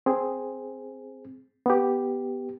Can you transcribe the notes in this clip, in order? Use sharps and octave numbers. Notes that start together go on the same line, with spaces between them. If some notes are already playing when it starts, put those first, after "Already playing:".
C4 G#4
B3 G4